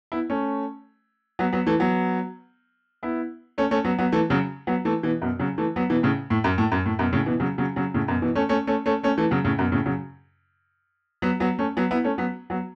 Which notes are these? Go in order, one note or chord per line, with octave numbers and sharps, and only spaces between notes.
B3 E4
A3 C#4
F#3 B3
F#3 B3
E3 A3
F#3 B3
B3 E4
A3 C#4
A3 C#4
F#3 B3
F#3 B3
E3 A3
C#3 F#3
F#3 B3
E3 A3
B2 E3
F#2 B2
C#3 F#3
E3 A3
F#3 B3
B2 E3
A2 C#3
A2
F#2
A2
F#2
A2
F#2 B2
A2 C#3
B2 E3
C#3 F#3
C#3 F#3
C#3 F#3
A2 C#3
F#2 B2
B2 E3
A3 C#4
A3 C#4
A3 C#4
A3 C#4
A3 C#4
E3 A3
C#3 F#3
A2 C#3
F#2 B2
A2 C#3
C#3 F#3
F#3 B3
F#3 B3
A3 C#4
F#3 B3
B3 E4
A3 C#4
F#3 B3
F#3 B3